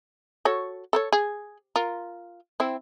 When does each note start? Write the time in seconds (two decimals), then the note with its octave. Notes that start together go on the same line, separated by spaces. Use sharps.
0.45 F#4 A4 C#5
0.93 A4 A#4 C#5
1.12 G#4
1.76 F4 A#4
2.60 C4 E4